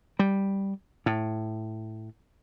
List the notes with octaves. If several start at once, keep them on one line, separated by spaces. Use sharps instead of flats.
G3
A2